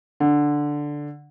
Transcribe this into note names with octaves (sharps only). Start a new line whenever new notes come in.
D3